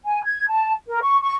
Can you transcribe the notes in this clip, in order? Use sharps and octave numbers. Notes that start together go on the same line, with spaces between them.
G#5
G#6
A5
A#4
C#6
C#6